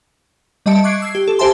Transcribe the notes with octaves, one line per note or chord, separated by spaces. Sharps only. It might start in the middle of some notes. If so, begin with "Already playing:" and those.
G3 D#5 E5 A5 C#7 D7
C#6 D6 F#6 G#6 C7 D7
E6 G#6 C7
G4
A4
G4 C5 E5 G#5 A5 C6